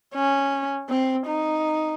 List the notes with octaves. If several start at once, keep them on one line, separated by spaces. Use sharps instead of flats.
C#4
C4
D#4